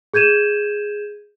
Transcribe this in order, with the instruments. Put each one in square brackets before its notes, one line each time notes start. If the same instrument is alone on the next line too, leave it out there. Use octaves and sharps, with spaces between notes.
[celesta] G#4 G6 G#6 D#7 E7